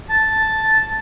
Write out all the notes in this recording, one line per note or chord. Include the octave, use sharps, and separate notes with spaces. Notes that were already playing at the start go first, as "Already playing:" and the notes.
A5